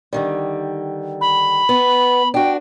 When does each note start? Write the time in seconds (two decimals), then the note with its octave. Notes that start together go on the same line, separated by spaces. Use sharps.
0.13 D3 D#3 G3
1.21 B5
1.69 B3
2.34 D4 F#4 G5